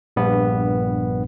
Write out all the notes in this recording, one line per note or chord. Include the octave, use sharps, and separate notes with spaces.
A#1 G2 B3